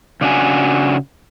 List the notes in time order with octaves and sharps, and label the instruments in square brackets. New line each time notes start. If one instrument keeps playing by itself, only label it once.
[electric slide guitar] C#3 D4 F#4 G#5